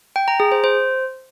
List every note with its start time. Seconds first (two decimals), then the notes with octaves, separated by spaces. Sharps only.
0.16 G5
0.28 A#5
0.40 G#4
0.52 C5
0.64 C5